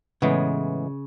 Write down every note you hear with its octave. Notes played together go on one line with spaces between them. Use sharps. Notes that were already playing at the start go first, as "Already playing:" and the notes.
A2 C#3 E3 G#3 B3